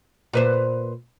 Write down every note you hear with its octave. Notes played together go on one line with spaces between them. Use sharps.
A#2 B4 C5